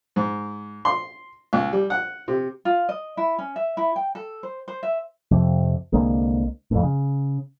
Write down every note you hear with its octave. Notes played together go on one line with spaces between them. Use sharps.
G#2
C6
C#2
G3
F#5
C3
F4
D#5
E4
C#4
E5
E4
G5
A4
C5
C5
E5
F2 C3 F3
C2 D3 G#3 A#3
F2 A2
C#3